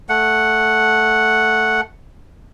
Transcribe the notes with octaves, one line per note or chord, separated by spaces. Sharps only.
A3 F#5